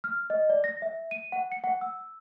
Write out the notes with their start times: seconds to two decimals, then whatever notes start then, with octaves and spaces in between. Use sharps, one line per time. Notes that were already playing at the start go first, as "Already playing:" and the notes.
0.04 F6
0.30 D#5
0.49 D5
0.64 A#6
0.82 E5
1.11 D#7
1.32 F#5
1.52 C#7
1.64 F#5
1.81 E6